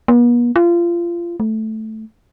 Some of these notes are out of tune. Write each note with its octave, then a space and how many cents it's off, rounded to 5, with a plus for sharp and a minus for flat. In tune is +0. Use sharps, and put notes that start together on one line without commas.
B3 -45
F4 -25
A3 -5